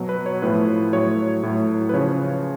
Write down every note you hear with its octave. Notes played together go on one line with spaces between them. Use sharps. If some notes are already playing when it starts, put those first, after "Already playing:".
Already playing: B2 F#3
B4
C#5
A2 F3 B4
A2 F#3 C#5
A2 F#3
B4
C#3 F3 C#5